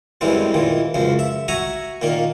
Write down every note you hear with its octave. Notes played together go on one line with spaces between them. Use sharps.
F#2 A2 E3 G3 G#3 C4
A#2 D#3 E3
C#2 F#2 F3
E5
F#4 E5 G#5 A#5 C#6
A#2 D#3 A#3